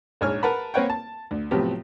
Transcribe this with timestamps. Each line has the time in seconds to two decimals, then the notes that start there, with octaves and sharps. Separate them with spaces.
0.21 A#1 G#2 C#5 G#5 F6
0.43 A#4 B4 F#5 A5 B5
0.74 A#3 C4 B4 C#5 F#5 G5
0.90 A5
1.31 D2
1.51 A2 C3 F3 F#3 B3 G4